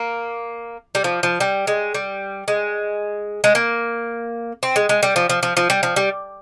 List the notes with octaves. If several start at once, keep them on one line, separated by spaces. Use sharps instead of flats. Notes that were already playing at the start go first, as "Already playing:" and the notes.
Already playing: A#3
G3
F3
F3
G3
G#3
G3
G#3
G#3
A#3
C4
G#3
G#3
G3
F3
F3
F3
F3
G3
F3
G3